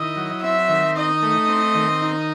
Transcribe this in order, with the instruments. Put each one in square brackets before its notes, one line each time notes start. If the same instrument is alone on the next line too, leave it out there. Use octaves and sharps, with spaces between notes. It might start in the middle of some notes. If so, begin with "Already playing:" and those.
Already playing: [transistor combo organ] D#3 E4 [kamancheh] D#5
[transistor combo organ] F#3
[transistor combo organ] C4 [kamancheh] E5
[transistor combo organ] D#3
[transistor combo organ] D#4 [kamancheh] D#5
[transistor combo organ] A3
C4
D#3
D#4